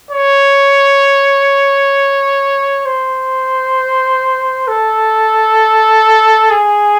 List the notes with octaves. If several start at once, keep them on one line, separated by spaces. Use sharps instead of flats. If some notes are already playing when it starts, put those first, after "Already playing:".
C#5
C5
A4
G#4